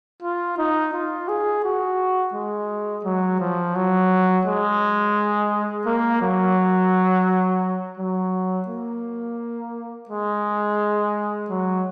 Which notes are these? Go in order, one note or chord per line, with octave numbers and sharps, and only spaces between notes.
F4
D#4
F4
G#4
F#4
G#3
F#3
F3
F#3
G#3
A#3
F#3
F#3
A#3
G#3
F#3